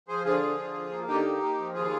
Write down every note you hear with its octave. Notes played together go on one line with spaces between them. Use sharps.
F3 G#4 C5
D3 F4 G#4
F3
D3
F3
A#3
D3 D#4 G4
A#3
A#3
F3
D#2 F4 G#4